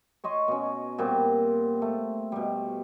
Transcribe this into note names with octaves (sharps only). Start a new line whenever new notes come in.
C#5 D#5 C6 C#6
B2 C#4
A#2 G3 B3 C4
A3
B2 G3